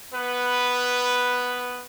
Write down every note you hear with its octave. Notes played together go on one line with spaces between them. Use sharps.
B3 B4